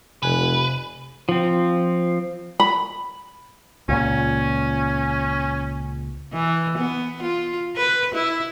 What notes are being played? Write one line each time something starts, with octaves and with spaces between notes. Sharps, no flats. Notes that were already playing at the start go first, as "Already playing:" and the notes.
F1 C3 B4 G#5 F#6
F3 C4
B5
C#2 A#2 C#4
E3
B3
F4
B4
E4